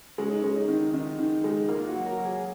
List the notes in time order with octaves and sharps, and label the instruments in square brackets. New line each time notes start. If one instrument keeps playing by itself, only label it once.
[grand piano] G#3 [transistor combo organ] C#4
[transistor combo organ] D#4
[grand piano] G#3 [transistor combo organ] C#4
[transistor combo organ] D#4
[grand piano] D#3
[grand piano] D#3 [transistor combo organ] D#4
[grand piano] D#3
G#3
[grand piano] A#3 [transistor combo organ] F4
[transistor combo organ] F#4
[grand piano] F#3
[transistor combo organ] A#4
[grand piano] F#3
[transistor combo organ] G#4